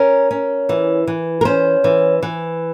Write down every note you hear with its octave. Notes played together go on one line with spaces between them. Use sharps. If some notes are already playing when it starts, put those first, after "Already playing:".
Already playing: C#4 A#4
C#4
E3
E3
A#4
C#4 C5
E3
E3